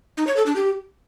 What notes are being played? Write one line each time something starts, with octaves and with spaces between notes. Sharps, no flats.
D#4
C#5
A4
D4
G4